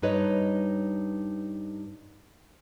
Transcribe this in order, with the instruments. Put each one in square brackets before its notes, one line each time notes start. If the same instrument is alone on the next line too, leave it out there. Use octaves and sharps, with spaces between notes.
[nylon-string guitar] G2 D#4 B4 C#5 D#5